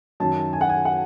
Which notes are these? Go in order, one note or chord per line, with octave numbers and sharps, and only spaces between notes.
F#2 D#3 F#3 A5
G#5
F#5
G#5
F#5